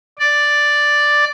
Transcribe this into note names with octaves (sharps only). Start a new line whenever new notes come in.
D5